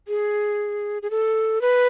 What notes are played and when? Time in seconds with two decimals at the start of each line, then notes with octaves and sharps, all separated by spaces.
0.08 G#4
1.02 G#4
1.11 A4
1.61 B4